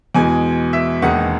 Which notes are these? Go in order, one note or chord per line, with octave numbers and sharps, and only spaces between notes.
E2 B2 G#3 G#5
E5
E1 D#2 D#3 G#3 F#5